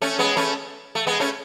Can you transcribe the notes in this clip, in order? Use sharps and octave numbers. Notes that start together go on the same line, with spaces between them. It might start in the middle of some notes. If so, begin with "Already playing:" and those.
A3 C#4
G#3 B3
A3 C#4
A3
G#3 B3
A3 C#4